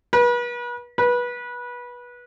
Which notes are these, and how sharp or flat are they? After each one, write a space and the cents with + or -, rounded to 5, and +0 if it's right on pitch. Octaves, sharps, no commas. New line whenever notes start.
B4 -35
B4 -20